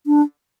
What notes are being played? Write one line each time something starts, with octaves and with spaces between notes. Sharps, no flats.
D4